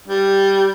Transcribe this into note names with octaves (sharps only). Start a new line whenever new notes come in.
G3